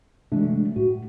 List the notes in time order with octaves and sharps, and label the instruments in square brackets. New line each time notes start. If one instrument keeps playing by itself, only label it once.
[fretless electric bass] C3 E3 F#3 [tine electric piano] G#3 A3 D4
[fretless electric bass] A2 [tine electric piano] F#4